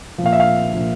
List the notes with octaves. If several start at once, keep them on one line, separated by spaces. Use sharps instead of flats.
F3
A#2 F5
E5
F5
A#2 F3